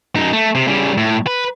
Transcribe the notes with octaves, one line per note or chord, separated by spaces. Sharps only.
F#2 D#4
A3
C3
C#3 G3
A2
B4